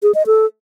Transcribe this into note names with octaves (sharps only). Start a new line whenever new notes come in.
G#4
D#5
A4